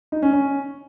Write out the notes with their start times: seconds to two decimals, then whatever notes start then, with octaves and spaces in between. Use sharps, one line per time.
0.12 D#4
0.22 C#4
0.33 C#4